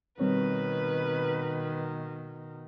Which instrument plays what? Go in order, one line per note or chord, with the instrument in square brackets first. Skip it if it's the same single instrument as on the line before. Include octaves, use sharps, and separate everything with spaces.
[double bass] B2 D#3 [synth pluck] G3 C4 C#5 [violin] B4